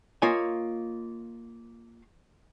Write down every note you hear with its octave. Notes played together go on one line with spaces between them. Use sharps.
A#3 F4 C#5 D#5 F5 G#5